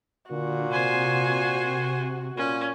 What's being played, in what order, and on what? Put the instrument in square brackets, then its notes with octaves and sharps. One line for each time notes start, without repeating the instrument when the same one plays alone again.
[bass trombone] A#2 [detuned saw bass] D3 [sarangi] F#4
[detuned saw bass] C3 [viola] C5 G#5
[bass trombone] A#2 [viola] C#4